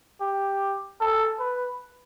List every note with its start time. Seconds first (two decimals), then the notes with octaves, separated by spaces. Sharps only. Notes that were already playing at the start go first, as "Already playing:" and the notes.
0.21 G4
1.01 A4
1.40 B4